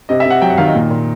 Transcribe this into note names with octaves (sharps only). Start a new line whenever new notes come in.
C3 D#5
E5
C3
F#5
F#3 G5
F#5
D#3 F5
D#5
A#2
A#2